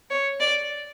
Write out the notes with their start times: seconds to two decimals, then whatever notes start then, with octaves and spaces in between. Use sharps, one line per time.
0.10 C#5
0.40 D5